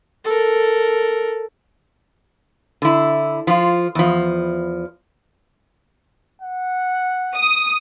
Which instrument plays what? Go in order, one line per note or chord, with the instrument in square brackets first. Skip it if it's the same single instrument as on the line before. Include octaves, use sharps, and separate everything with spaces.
[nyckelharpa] A4 A#4
[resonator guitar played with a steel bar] D3 E4
F3 F4
E2 F3
[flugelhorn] F#5
[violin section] D#6